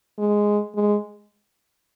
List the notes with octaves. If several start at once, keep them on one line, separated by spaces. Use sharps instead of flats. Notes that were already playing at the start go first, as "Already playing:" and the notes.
G#3
G#3